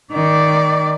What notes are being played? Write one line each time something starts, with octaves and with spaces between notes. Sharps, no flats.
D#3 D5